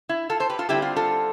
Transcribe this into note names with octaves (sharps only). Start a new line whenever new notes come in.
E4
F4 A4
A4 C5
G4 B4
F4 A4
D3 G3 C4 E4 G4
F4
F4 A4